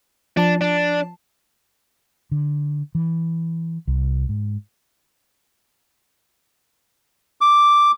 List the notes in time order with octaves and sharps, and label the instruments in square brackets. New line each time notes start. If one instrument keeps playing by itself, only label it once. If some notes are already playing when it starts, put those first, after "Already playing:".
[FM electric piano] F3 A5 [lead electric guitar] D4
[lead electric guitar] D4
[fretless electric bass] D3
E3
C2
G#2
[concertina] D6